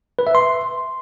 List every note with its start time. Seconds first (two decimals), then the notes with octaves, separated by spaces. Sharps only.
0.19 B4
0.27 E5
0.35 C6